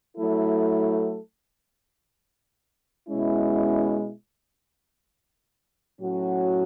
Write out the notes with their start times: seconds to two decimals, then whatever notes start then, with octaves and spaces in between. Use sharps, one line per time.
0.17 F#3 A3 E4 A4
3.08 B2 G#3 C#4 E4
6.01 A2 F#3 C#4 F#4